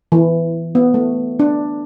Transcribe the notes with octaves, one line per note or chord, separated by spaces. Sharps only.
E3
B3
A3
D4